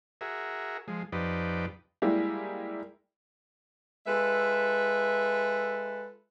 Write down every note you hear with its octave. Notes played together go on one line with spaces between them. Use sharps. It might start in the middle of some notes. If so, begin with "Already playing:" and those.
F#4 G#4 A#4 E5
F3 G#3
F2 F3 D#4 G4 B4 D5
G3 G#3 A#3 E4 G4
G#3 F4 A4 B4 E5